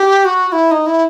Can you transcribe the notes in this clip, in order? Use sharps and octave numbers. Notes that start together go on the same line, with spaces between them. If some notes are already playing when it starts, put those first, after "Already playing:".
Already playing: G4
F#4
F#4
E4
D#4
E4